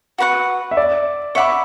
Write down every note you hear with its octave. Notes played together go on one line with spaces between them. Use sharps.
F#4 B4 F#5 C#6
E5
D5
C#5 E5 F#5 B5 D6